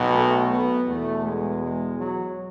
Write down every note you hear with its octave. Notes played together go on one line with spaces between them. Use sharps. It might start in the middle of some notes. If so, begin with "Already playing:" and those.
Already playing: B1 B2
A3
B3
E2 B2 A3
G#3
G#3
F#3